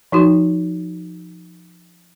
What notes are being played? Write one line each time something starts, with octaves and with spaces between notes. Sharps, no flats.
F3 D#4 F#4